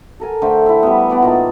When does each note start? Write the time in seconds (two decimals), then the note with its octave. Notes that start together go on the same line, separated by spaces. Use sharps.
0.20 A4 A#4 G#5
0.42 D3 A3 C5 G5
0.66 E4 E5
0.83 G3 B3
1.09 B3 D5 F#5
1.22 A#2 D#4 A5